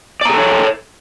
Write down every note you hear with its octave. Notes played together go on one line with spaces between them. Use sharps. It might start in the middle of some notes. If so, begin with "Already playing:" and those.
G#4 A4 C#5 D5 A#5